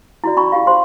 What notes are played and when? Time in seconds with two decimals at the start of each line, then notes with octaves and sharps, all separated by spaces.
0.24 E4 F#4 D5
0.37 C#4 G5 B5 C#6
0.52 E4 G4 F5
0.67 G4 C5 C6